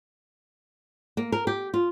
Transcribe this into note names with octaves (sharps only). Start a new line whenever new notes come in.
A#3
A#4
G4
F4